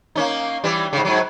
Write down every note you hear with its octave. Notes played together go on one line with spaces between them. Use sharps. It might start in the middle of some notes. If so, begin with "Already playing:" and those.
A#3 C#4 D#4
E3 G3
G#2 C#3
G#2 F#3